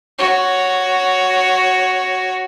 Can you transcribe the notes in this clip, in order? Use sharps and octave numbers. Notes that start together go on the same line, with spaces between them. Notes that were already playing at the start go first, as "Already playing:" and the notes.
F#4 C#5